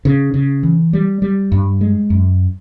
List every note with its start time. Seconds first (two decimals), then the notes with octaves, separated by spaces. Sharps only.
0.05 C#3
0.34 C#3
0.63 E3
0.93 G3
1.22 G3
1.52 G2
1.81 G#3
2.10 F#2